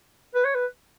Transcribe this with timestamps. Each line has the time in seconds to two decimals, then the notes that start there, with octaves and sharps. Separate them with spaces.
0.35 B4
0.45 C#5
0.55 B4